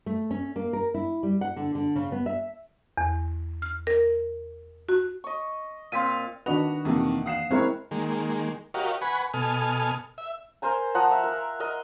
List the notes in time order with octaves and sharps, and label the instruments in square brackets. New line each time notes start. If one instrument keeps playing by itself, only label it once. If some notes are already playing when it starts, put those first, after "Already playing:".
[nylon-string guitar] A3
C#4
A#3
A#4
E4
G3
F#5
D3
D3
C#3
B3
E5
[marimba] E2
F6
A#4
F#4
[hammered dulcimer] D#5 C#6
[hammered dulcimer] A#2 C4 F5 [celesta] C6 B6 D#7
[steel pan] D#3 D4 B4 [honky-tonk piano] F#4 D#5 [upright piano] F7
[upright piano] F2 C3 D#3 [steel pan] E3 A#3
[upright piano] F5 F#5 [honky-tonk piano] D#6 C7 E7
[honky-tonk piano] G#3 F#6 [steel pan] C4 E4 A#4 [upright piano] C#4 C#5
[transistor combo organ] D#3 G#3 A#3
F#4 G4 A#4 C#5 D#5 F5
B4 F#5 G#5 B5 C#6
B2 A4 G#5 D#6 F6
E5
[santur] A#4 C5 G#5 A#5
F3 F#5 A#5 D#6
E5
A#4
A#4 D#5